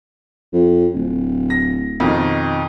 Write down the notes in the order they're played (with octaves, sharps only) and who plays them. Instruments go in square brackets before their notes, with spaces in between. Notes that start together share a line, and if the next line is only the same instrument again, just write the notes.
[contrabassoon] F2
D1
[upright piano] A#6
F2 B2 D#3